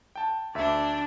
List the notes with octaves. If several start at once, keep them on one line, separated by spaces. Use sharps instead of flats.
G5 A5
D2 D4 D5 E5